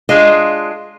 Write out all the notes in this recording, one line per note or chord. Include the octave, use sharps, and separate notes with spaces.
G#3 D4 F4 D#5